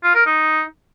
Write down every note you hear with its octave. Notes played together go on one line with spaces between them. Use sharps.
F4
A#4
D#4